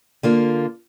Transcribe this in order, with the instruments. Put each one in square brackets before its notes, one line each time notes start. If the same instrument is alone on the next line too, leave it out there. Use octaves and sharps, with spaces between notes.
[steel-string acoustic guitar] D3 A#3 F4